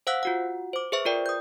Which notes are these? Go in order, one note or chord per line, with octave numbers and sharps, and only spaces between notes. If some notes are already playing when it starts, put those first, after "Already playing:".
C5 F5 F#5 E6 F#6 B6
F4 F#4 F#5
C5 D6
G#4 B4 C5 E5 C#6
F4 A#4 D5 G5
D#6 G6